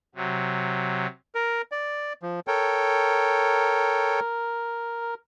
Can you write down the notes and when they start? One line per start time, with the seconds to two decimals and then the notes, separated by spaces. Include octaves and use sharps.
0.15 C3 F#3
1.35 A#4
1.72 D5
2.22 F3
2.48 A4 A#4 C#5 G5